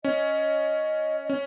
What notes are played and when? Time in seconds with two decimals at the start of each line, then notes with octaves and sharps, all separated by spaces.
0.04 C#4 D#5
1.25 D#5
1.29 C#4 C#5